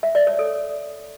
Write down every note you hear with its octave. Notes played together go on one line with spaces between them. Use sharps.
E5
D5
C#5
A4